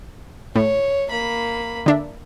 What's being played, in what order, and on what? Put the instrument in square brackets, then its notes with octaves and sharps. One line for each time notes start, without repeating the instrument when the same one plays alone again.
[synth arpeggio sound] A2 [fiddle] C#5
[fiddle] A#3 B5
[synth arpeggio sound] D3 D4 E5